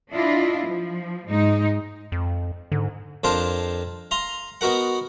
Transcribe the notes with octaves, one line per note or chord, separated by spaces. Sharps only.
D4 E4 F4 D#5
F3
G#2 G#3 D#4
F2
G#2 D3
F2 D4 F4 A#4 C5 A5
F5 A#5 C6
B3 D#4 F#4 A#4 F#5